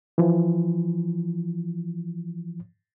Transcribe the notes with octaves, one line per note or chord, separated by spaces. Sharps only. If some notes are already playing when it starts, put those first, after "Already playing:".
E3 F3